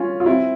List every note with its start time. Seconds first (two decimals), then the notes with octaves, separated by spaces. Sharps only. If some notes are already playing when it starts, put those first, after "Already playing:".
Already playing: C#4 F4
0.20 F4
0.26 C4 E4